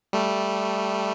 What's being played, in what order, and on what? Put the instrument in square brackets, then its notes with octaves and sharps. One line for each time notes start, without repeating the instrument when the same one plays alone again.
[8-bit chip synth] G3 A3